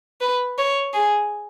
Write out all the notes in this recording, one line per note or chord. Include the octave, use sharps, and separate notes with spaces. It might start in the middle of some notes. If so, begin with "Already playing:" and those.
B4
C#5
G#4